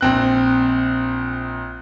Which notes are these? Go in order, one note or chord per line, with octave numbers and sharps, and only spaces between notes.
A#1 C4 F#6